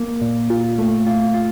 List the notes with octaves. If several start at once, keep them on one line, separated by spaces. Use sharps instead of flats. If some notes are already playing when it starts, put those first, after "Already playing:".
Already playing: A#3
A#2
F4
A3
F4
F4